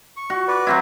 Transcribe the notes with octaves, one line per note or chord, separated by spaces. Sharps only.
C#6
F#4
B4 D5
F#3 C4 E4